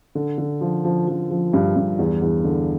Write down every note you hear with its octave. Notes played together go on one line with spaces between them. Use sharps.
D3
D3
F3
F3
F3
F3
G2
G2
E2
E2
D3